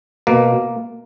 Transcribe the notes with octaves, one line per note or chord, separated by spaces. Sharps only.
B2 A#3